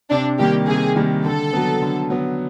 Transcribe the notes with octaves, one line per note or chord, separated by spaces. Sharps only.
C3 D4
D#3 G3 A#3 G4
C3 G#4
D#3 G3 A#3
D3 A4
F#3 B3
D3
F#3 B3